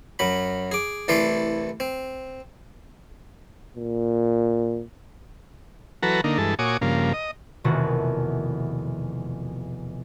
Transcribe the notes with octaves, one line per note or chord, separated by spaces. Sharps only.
F#2 F#3 B5
G#4 D6
C2 E3 A3 D5 C6
C4
A#2
E3 F#3 F#4 A4 B4 A#5
D3 A#3 D#4
G2 E3 G#3 A4
A#2 F#4 C#5 G#5 D6 D#6
G2 C#3 F3 A#3
D#5
F1 E2 B2 D#3 F3 F#4